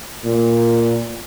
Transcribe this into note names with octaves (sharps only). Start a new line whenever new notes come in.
A#2